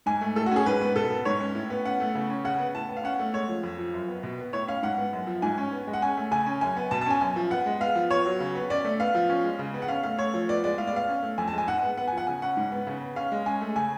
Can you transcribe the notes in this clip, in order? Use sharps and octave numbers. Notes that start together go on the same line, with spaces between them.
G#2 G#5
A3
A2 A4
F#4
C#4 G#4
G#2 B4
B3
B2 A4
B3
G#2 C#5
C#4
A2
B3
C#4 F#5
A3
C#3
C#4
C#3 F#5
B3
A2 A5
B3
F5
C#4 F#5
A3
G#3 C#5
F3
F2
F3
F#2
B3
B2
B3
A2 C#5
C#4 F5
G#2 F#5
B3
F#2
F3
G#2 G#5
C#4
B3
G#3
F#5
C#4 G#5
A3
C#3 G#5
C#4
F#2 G#5
B3
B2 A5
A5
C#4 G#5
F#2 G#5
F3
B3 F#5
G#3
B3 F5
F3
B3 C#5
F#3
C#3
B3
C#4 D5
A3
B3 F5
F3
C#4
G#3
C#3
B3
F#5
C#4 F5
A3 F5
A3 C#5
F3
B3 D5
G#3 D5
A2 F5
D5
B3 F5
C#4
A3
F2 G#5
A5
G#3
G#5
G#2 F#5
B3
B3 F#5
G#5
F3
F#5
C#3 G#5
C#4 F#5
G#2
B3
C#3
B3
C#4 F5
G#3
C#4 G#5
A3
C#3 G#5